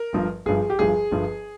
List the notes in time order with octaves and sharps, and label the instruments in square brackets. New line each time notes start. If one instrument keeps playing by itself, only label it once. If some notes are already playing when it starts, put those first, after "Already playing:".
Already playing: [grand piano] A#4
G1 G2 F3
G1 G2 F3 G#4
G4
G1 G2 F3 G#4
G1 G2 F3